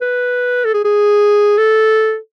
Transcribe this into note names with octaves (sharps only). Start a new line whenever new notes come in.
B4
A4
G#4
G#4
A4